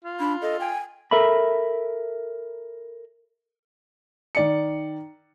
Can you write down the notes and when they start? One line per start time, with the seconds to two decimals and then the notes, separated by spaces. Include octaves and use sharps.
0.04 F4
0.20 D4 B5
0.42 A4 D#5
0.60 G5 G#5
1.11 A4 A#4 E5 A#5 B5
4.35 D#3 D5 C#7